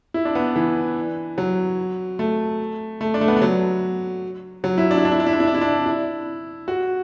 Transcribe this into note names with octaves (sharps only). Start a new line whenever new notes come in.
E4
D4
B3
E3
F#3
A3
A3
D4
A3
B3
A3
F#3
F#3
E4
D4
E4
D4
E4
D4
E4
D4
E4
D4
E4
D4
E4
F#4